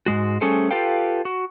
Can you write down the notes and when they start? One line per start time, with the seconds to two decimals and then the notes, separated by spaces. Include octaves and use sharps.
0.06 G#2 G#3 F#4
0.41 G3 A3 C#4 G#4 A4 C5
0.71 F4 G4 A4 B4 F5 G5
1.25 F#4